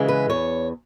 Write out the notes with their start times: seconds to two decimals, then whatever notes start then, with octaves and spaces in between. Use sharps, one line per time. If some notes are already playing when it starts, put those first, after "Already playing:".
Already playing: C#3 E3 G#3
0.08 B4
0.29 E2 C#5